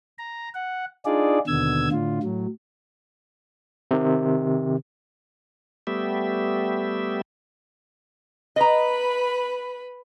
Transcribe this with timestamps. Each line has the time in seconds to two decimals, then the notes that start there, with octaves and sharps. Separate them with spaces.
0.18 A#5
0.54 F#5
1.05 D4 D#4 F4 G#4 D5
1.47 D#2 B2 D3 E6 G#6
1.92 A2 D3 F4
2.23 A2 F#3
3.91 C3 D#3
5.87 G3 A3 B3 G4 E5
8.56 B4 D#5 A#5 B5